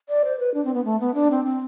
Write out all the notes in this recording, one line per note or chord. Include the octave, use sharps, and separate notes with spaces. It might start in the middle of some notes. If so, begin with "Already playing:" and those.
D5
C5
B4
D4
C4
B3
A3
B3
D4
C4
C4